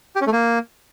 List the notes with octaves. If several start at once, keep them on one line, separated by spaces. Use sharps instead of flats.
G4
C#4
A3
A#3